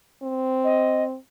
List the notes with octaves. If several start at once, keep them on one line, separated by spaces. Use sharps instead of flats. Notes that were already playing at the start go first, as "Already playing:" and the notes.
C4
D#5